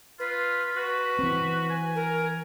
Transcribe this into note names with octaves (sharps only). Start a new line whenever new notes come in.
F4 B4
F#4
E3 C4
G#5
A#4